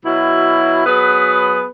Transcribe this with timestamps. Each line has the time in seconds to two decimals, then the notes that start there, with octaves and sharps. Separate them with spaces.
0.03 B2 F#3 E4
0.85 F#3 B3 G#4 B4